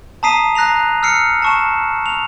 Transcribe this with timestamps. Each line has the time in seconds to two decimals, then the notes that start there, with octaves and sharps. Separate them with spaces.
0.23 A5 A#5 D#6 B6 C7 D#7
0.55 A#5 F#6 A#6 C7 F7
1.03 E6 F6 C7 C#7
1.42 A5 C#6 E7
2.06 F7